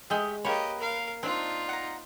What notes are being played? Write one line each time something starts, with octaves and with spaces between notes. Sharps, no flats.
G#3 A3 G4 D#5
A#3 G4 B4 C#5 D#5
A#4 F5
C4 D4 D#4 F4
F#5 A#5